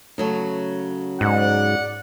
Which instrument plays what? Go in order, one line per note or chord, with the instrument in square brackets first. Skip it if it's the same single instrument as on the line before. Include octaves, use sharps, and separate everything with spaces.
[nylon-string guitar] C#3 F#3 A3
[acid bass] G#2 [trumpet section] D5 F#5